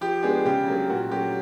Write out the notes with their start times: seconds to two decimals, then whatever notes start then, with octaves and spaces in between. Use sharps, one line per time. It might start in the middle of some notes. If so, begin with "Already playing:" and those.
0.01 F3 G4
0.23 G#3 B3 D4 G#4
0.45 C#3 G4
0.68 F#3 A#3 D4
0.89 A#2 F#4
1.11 F#3 A3 C#4 G4